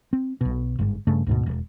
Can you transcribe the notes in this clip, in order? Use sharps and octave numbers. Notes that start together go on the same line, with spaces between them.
C4
B1 B2
G1 G#2
G2 C#3 A3
D2 G#2 B2
E1